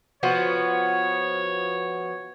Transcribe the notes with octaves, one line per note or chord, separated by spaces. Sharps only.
F3 B3 F#4 C#5